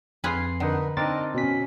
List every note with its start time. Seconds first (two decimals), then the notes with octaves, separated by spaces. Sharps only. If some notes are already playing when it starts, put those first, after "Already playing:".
0.24 F2 F4 G#4 B4 C6 C7
0.60 D3 D#4 A#4 B4 F#5
0.97 C4 D4 D#4 A#4 A6
1.34 B2 C#4 B6